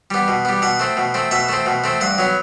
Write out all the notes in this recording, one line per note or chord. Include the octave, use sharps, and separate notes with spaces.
G3 B3
B2
G3 B3
B2 F#5
A3 C4
B2
A3 C4
B2 E5
A3 C4
B2
A3 C4
G2 F#5
F#3 B3